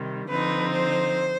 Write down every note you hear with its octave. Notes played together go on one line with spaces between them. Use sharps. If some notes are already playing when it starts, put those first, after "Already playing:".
Already playing: C3 D#3 G3
D3 F3 C4 D#4 B4
C5